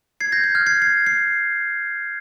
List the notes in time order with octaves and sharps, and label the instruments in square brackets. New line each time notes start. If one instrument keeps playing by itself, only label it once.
[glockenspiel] G#6 C7
G6 A#6
G6
F6 G#6
G#6 C7
G#6 C7
C7